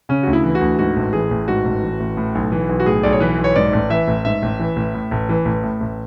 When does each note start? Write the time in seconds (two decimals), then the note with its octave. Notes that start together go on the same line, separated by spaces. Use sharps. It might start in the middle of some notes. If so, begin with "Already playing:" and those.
0.09 C#3 C#4
0.23 D2 F#4
0.33 E4
0.44 E3
0.55 F#4
0.61 D2
0.79 G#2 F#4
0.96 A1
1.13 E3 G#4
1.31 A1
1.48 G#2 F#4
1.65 A1
1.83 E3
2.00 A1
2.17 A2
2.35 B1
2.52 E3
2.69 B1
2.80 F#4
2.86 A2 G#4
3.03 B1 D5
3.13 C#5
3.20 E3 B4
3.38 B1
3.44 C#5
3.56 G#2 D5
3.73 A1
3.90 E3 E5
4.08 A1
4.25 G#2 E5
4.42 A1
4.60 E3
4.76 A1
4.94 A2
5.11 A1
5.29 E3
5.45 A1
5.63 A2
5.81 A1